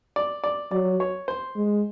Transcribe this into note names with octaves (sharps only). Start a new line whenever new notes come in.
D5
D5
F#3 D5
C#5
C5
G#3